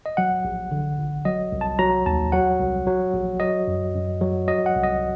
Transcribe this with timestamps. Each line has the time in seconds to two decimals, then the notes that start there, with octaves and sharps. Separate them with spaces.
0.06 D#5
0.17 F#3 F#5
0.45 A#1
0.71 D3
0.99 G1
1.25 F#3 D#5
1.52 C2
1.61 A5
1.79 F#3 A#5
2.06 D#2 A5
2.32 F#3 F#5
2.60 C2
2.87 F#3
3.14 A#1
3.40 F#3 D#5
3.67 F#2
3.95 F#2
4.21 F#3
4.48 F#3 D#5
4.66 F#5
4.75 C2
4.84 D#5